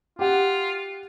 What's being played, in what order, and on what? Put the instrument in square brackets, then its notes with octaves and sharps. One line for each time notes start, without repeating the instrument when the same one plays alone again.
[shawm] F4 [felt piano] G4 F#5